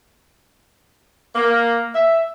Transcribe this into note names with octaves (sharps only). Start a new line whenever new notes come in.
A#3
E5